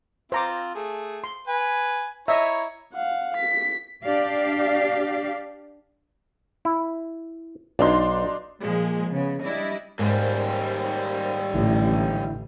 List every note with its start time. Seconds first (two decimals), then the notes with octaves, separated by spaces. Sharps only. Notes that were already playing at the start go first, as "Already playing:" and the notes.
0.32 C4 F4 C5 A#5 D6
0.75 A3 G#4
1.24 C6
1.48 B4 G#5
2.28 E4 C#5 D#5 E5 A#5
2.93 F5 F#5
3.37 B6
4.04 D4 G4 D5 F5
6.65 E4
7.79 B1 D4 D#4 C6
8.61 A#2 F3 G#3 A#3
9.08 C#3 B3
9.44 G3 D4 E4 D#5
9.99 D#2 G#2 G3 A#4 C5
11.54 A1 D3 E4